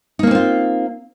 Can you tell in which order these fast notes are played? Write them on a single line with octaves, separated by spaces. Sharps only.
D#4 A#3 C#4 C4 F4